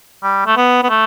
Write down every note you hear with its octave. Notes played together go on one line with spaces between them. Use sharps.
G3
A3
B3
B3
A3